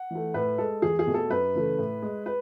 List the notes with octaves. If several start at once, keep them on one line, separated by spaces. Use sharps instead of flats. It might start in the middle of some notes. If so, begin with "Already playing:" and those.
Already playing: F#5
E3 A3
A2 B4
G#3 A4
E2 G#4
G#4
B2 A3
A4
F#2 B4
C#3 E3 A3
A2
G#3
B4